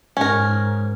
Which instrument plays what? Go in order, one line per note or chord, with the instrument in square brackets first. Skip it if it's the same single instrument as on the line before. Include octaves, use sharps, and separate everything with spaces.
[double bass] G#2 [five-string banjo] C#4 A#4